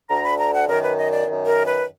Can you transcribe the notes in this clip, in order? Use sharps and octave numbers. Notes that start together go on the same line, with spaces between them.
D2 D3 A#5
B5
A#5
F#5
F#2 D#3 A#4
B4
D#5
D5
F#2 D#3
A#4
B4